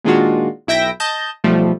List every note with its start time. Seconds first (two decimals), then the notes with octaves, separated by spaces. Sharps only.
0.04 A#2 D#3 G#3 D4 F4 F#4
0.67 B1 E4 E5 G5 A#6
1.00 D#5 A5 G6
1.44 B1 F3 G3 A3